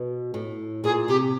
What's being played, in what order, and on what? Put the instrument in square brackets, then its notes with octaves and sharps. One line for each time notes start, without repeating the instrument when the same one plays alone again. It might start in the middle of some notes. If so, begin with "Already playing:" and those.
Already playing: [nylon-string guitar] B2
A2
[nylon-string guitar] A#2 [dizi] G#4
[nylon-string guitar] C3 [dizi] G4